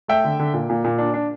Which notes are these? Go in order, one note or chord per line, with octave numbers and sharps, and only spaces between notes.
A3 E5 G5
D3
D3
A#2
A#2
A#2
D4
D4